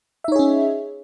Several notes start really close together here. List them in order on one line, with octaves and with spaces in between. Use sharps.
E5 D#4 C#5 G#4 C#4